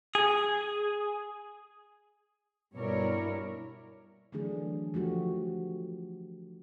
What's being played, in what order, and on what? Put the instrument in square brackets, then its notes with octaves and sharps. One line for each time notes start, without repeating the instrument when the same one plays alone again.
[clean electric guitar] G#4
[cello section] G2 B2 E4 A#4 C#5 D5
[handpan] D3 E3 F#3 A3 D4 G#4
F3 A3 F#4 G4